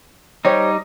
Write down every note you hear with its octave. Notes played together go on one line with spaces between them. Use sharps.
G3 D#4 G4 C5 C#5